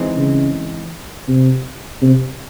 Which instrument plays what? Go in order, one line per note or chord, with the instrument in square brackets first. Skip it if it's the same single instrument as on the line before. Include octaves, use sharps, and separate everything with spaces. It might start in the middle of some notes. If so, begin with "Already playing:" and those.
Already playing: [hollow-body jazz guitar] E3 G#3 C4 D#4
[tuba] C#3
C3
C3